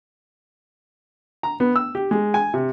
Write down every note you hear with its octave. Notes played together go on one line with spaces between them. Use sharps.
A#5
B3
E6
G4
G#3
G#5
C3